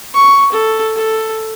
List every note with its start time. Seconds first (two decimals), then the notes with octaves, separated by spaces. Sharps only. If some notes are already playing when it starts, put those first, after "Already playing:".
0.14 C#6
0.52 A4
0.96 A4